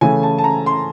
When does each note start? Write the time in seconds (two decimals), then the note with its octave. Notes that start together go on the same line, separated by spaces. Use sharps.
0.01 C#3 E3 A3 G#5
0.23 A5
0.38 A5
0.44 A#5
0.66 C6